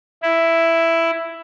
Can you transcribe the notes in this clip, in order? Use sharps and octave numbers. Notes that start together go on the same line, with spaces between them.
E4